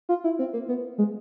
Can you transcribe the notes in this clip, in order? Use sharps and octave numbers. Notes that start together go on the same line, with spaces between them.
F4
E4
C4
A#3
B3
G#3